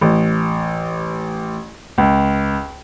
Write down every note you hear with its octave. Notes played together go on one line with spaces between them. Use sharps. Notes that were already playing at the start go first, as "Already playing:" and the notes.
A1
C#2